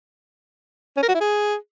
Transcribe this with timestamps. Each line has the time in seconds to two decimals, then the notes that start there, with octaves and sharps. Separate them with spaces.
0.97 C#4
1.03 A#4
1.09 F#4
1.14 E4
1.20 G#4